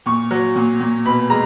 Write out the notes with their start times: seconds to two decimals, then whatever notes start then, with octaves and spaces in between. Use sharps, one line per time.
0.06 A#2 C#6
0.31 F#3
0.55 A#2
0.80 A#2
1.06 B2 B5
1.30 G#3 A#5